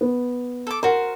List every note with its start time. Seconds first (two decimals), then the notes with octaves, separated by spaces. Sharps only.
0.01 B3
0.67 A4 D6
0.83 F#4 A#4 C5